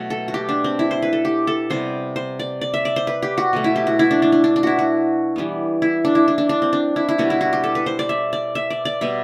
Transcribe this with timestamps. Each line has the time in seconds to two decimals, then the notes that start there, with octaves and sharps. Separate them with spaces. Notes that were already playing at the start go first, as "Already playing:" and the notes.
Already playing: B2 F#3 A3
0.10 A4
0.28 F#4
0.34 G4
0.49 D4
0.64 C4
0.79 E4
0.91 C5
1.02 B4
1.13 A4
1.25 G4
1.47 A4
1.70 C3 G3 B3 C5
2.16 C5
2.39 D5
2.61 D5
2.74 E5
2.85 D5
2.96 C5
3.07 B4
3.22 G4
3.38 F#4
3.53 B2 F#3 A3
3.64 E4
3.76 G4
3.87 F#4
3.99 E4
4.11 D4
4.22 D4
4.32 D4
4.44 D4
4.56 D4
4.63 E4 F#4
4.79 F#4
5.36 E3 G3 B3
5.82 E4
6.05 D4
6.15 E4
6.28 D4
6.38 D4
6.49 D4
6.62 C4
6.73 D4
6.96 E4
7.09 E4
7.18 B2 G3 B3 F#4
7.30 E4
7.41 F#4
7.53 G4
7.64 A4
7.75 B4
7.86 C5
7.99 D5
8.09 E5
8.33 D5
8.55 E5
8.70 D5
8.85 D5
9.01 B2 G3 B3 E5